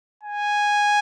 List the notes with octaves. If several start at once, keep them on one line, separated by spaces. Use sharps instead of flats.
G#5